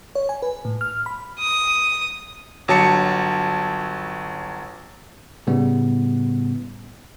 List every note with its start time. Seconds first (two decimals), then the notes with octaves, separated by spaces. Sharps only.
0.15 C#5
0.29 G#5
0.42 B4
0.65 A2
0.81 F6
1.06 B5
1.39 D#6
2.68 G1 F#3 A5 C#7
5.47 A2 C#3 G3 B3